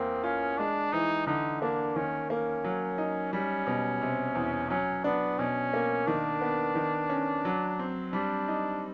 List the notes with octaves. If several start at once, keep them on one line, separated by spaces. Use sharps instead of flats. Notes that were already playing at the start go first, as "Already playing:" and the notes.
Already playing: E2 A#3 C4
C#4 F4
G#3 D4
E3 D#4
D3 D#4
A#3 D4
D#3 C#4
A#3 C#4
F#3
D#4
G3 C#4
B2
C3
E2
F#3 C#4
B3 D4
B2 C#4
A#3
D#3 D4
B3
D#3
C#4
F#3
C4
G3 D4
D#4